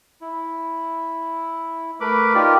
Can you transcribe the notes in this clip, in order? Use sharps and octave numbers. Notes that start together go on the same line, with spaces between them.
E4
A3 A#4 B4 B5 D6
D#4 F4 G4 A#4 D5